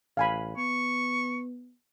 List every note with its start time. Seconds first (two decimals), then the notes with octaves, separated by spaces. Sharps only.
0.17 A1 F5 G#5 B5
0.57 B3 C#6